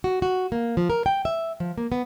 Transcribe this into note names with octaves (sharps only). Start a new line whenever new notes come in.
F#4
F#4
A#3
F3
A#4
G5
E5
F3
A#3
B3